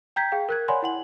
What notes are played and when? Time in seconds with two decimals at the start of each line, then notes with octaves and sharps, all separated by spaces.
0.16 G5 A#5 G6 G#6 B6
0.32 G#4 F5 G5
0.49 A#4 F#6 G#6
0.68 C#5 D5 F#5 G#5 B5 C6
0.82 E4 F#5 F#7